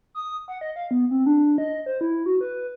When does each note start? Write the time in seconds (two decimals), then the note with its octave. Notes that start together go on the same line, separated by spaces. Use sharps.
0.15 D#6
0.48 F#5
0.61 D#5
0.76 F5
0.91 B3
1.11 C4
1.26 D4
1.58 D#5
1.86 C5
2.01 E4
2.26 F#4
2.41 B4